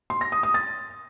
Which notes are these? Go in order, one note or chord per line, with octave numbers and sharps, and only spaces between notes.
C6
A#6
D#6
D#6
A6